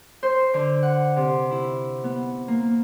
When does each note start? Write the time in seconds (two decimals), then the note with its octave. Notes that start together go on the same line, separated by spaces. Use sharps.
0.23 C5
0.54 D3
0.83 F#5
1.16 C3
1.51 E4
2.04 B3
2.48 A#3